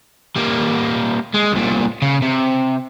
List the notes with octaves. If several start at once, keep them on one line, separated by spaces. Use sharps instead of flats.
G3 A#3
G#3
C2 A#2
C#3
C3